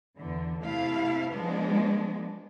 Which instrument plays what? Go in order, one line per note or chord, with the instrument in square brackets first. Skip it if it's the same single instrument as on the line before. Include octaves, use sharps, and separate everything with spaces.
[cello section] E2 D3
C3 A3 E4 F5
F3 G#3 B3 D4